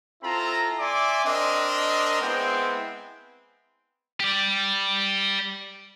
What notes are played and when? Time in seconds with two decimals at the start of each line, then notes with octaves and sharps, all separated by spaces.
0.23 C4 E4 F4 A4 A#5
0.79 D5 E5 G#5 C6 D6
1.25 C4 D4 A#4 D#5
2.22 G#3 B3 C4 E4 G5
4.20 G4 D5